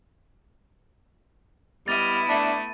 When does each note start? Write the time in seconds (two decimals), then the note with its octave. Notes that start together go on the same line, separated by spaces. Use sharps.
1.88 G3 B3 E4 D#5 F6 A6 D#7
2.28 A3 D4